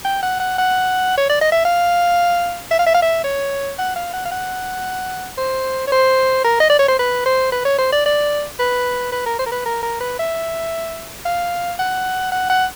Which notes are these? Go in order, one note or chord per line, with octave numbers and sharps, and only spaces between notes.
G5
F#5
F#5
F#5
C#5
D5
D#5
E5
F5
E5
F5
E5
F5
E5
C#5
F#5
F5
F#5
F5
F#5
C5
C#5
C5
A#4
D#5
D5
C#5
C5
B4
C5
B4
C#5
C5
D5
D5
B4
B4
A#4
C5
A#4
B4
A#4
A#4
B4
E5
F5
F#5
F#5
F#5